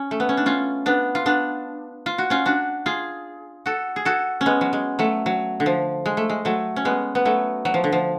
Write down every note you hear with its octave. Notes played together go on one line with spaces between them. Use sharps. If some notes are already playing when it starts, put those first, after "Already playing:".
Already playing: C#4
A3
B3
C#4
D4
C#4 F4
B3 D4
F4
B3 D4
F4
F#4
C#4 F4
D4 F#4
F4 G#4
F#4 A4
G#4
F#4 A4
C#4
G#3 B3
F#3
G#3
F#3 A3
F#3
D3
F3
G#3
A3
G#3
F#3 A3
C#4
G#3 B3
B3
F#3 A3
F#3
F3
D3
F3